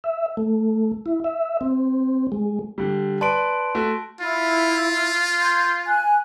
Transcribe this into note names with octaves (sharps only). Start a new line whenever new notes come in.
E5
A3
E4
E5
C4
G#3
D3 G3
B4 D5 A5 C6 D7
A3 F#4
E4 F4
C6 G6 G#6
G#5 F#6